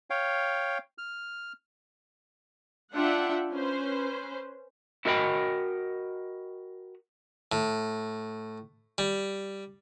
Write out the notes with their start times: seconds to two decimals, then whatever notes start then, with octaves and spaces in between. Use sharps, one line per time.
0.10 C#5 F5 G5
0.98 F6
2.94 D4 F4 E5 F#5 G5
3.52 C#4 B4 C5
5.05 E4 F#4 A#4 D#5 G5 B5
7.52 A2
8.98 G3